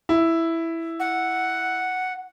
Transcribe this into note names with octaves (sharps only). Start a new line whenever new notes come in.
E4
F#5